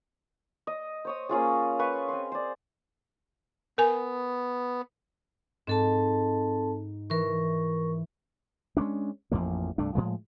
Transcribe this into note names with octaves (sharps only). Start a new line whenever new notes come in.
D#5
C5 C#5 D#6
A#3 C#4 F4 G#4
B4 F5 G#5 C#6
C4 C6
C5 D5
B3 A#4 G#5
G#2 C4 A4 A5
E3 A#4 C#6
G#3 A#3 C#4 D4
A1 F2 F3 A#3
C2 G2 A3 D4
A2 F3 G#3